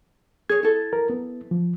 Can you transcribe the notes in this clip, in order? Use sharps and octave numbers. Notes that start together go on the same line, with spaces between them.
G#4 C#5 G#6
E4 A4
A#4
B3
F3